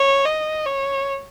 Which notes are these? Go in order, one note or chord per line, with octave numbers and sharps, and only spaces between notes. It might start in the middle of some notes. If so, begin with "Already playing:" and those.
Already playing: C#5
D#5
C#5